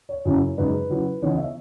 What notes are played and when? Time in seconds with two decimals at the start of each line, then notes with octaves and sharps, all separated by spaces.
0.09 C#5
0.25 F#2 C#3 F#3 C#4 E4
0.58 F#2 C#3 G#3 D#4 B4
0.89 C#3 F#3 C#4 E4
1.22 C#3 E3 B3 C#5
1.30 D#5
1.38 E5